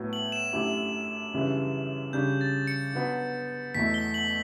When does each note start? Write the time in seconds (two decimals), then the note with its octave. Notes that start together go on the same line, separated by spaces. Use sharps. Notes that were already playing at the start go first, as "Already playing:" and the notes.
Already playing: A2 F#3 B3 F#4
0.13 F#7
0.32 E7
0.53 F#2 D3 A3 E4 G4
1.33 F#2 C#3 E3 G3 D4
2.13 C#3 G3 D4 G6
2.41 A6
2.67 C#7
2.93 D3 F#3 B3
3.75 E2 B2 F#3 A3 E4 B6
3.94 G7
4.14 F#7